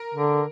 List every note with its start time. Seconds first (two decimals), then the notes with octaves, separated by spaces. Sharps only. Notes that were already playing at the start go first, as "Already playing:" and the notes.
Already playing: A#4
0.14 D3